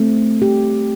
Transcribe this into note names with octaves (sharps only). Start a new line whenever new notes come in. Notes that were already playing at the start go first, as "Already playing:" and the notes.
Already playing: A3 C4
G4